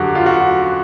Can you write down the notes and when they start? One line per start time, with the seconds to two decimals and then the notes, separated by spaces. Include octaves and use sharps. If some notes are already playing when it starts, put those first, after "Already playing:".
Already playing: F#2 D3 F#3 F#4 G4
0.15 F4
0.26 F#4